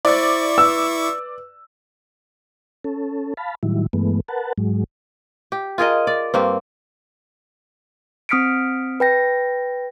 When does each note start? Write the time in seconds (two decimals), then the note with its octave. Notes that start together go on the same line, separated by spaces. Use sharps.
0.05 E4 C5 D5 C#6 D6 E6 A6
0.58 B4 E6
2.84 C#4 A4
3.37 F5 A5 B5
3.63 A2 D#3 F#3 G3 E4
3.93 G2 E3 G#3 A3 B3
4.28 A#4 B4 F#5 A5
4.58 G#2 F#3 G#3
5.52 G4
5.78 F4 G#4 A#4 D#5
6.07 D5
6.34 G2 A#3 C4
8.29 C4 D#6 F6 B6 C#7 D7
9.00 B4 G5 A#6